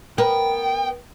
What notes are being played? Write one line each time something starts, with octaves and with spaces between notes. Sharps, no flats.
B3 A#4 B4 G5